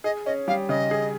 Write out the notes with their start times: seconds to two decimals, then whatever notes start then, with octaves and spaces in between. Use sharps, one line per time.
0.04 G#4 D#5
0.26 C#4 D#5
0.48 G3 F5
0.69 C#3 D#5
0.91 G#4